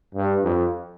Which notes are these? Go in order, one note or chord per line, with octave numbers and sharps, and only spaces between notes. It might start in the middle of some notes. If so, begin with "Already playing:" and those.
G2
F2